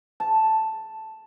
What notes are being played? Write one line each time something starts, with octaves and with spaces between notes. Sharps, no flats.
A5